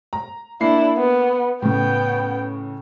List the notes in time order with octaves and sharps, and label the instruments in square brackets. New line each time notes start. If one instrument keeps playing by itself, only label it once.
[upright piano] A#5
[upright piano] A#3 C7 [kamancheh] D4 E4
[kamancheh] B3
[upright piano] A2 C#3 [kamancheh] B3 G5